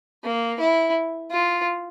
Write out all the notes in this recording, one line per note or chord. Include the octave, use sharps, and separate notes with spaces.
A#3
E4
F4